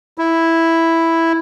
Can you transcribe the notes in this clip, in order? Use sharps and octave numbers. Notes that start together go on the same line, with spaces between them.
E4